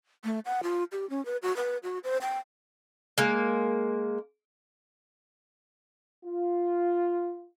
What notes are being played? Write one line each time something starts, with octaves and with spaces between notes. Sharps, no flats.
A3
F#5
F4
G4
C#4
B4
F#4
B4
F#4
C5
G5
G#3 A#3
F4